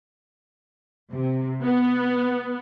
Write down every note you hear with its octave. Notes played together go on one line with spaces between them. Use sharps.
C3
B3